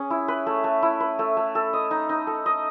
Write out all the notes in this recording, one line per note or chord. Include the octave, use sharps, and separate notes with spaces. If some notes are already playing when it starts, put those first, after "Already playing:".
Already playing: C#4 G#4
E4
B4
A3
A3
E4
B4
A3
A3
A4
D#5
D#4
D#4
A4
D#5